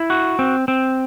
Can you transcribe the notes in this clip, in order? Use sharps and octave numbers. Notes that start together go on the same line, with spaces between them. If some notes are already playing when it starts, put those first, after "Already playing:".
Already playing: E4
F#4
C4
C4